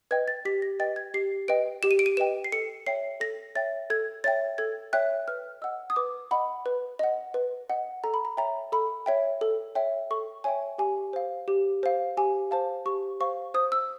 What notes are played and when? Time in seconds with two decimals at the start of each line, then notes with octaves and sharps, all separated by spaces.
0.11 B4 D#5 G5 G#6
0.28 A6
0.45 G4 B6
0.62 A#6
0.80 B4 D#5 G5 A6
0.96 G#6
1.14 G4 C7
1.48 B4 D#5 G5 D7
1.83 G4 E7
1.91 D#7
1.99 D7
2.06 D#7
2.17 B4 D#5 G5 E7
2.44 C7
2.52 A4 C#7
2.86 C#5 E5 G5 C7
3.20 A4 A#6
3.55 C#5 E5 G5 A6
3.90 A4 G#6
4.24 C#5 E5 G5 A6
4.58 A4 G#6
4.93 C#5 E5 G5 F#6
5.28 B4 F6
5.62 D#5 F#5 E6
5.90 D#6
5.96 B4 D6
6.31 D#5 F#5 B5
6.66 B4
6.99 D#5 F#5
7.34 B4
7.69 D#5 F#5
8.04 A4 A#5
8.14 B5
8.25 A#5
8.37 C#5 E5 G5 A#5
8.72 A4 B5
9.06 C#5 E5 G5
9.41 A4
9.75 C#5 E5 G5
10.11 A4 C#6
10.44 C#5 E5 G5 G#5
10.78 G4 G#5
11.13 C5 F5
11.48 G4
11.83 C5 F5
12.17 G4 G#5
12.51 C5 F5 A5
12.86 G4 C#6
13.20 C5 F5 C#6
13.54 C5 D#6
13.72 E6